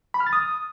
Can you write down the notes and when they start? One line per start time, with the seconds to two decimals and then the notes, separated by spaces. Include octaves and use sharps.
0.14 B5
0.20 F6
0.27 A6
0.33 D#6